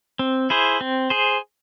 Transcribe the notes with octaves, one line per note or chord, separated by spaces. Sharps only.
C4
E4 G#4 C5
C4
G#4 C5